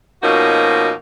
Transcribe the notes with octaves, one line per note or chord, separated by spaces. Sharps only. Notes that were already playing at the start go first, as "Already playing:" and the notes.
B2 F3 A#3 C#4 D#4 F#4